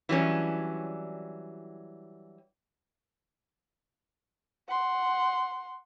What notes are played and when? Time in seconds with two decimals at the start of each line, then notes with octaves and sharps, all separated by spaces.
0.09 E3 F#3 G3 C#4 D4
4.68 F#5 C6